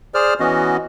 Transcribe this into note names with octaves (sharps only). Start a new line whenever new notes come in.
G#4 C5 D5 F6
E3 B3 C#4 F#4 D#5